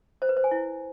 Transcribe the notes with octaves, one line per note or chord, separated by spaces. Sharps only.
C5
B4
C5
G#5
E4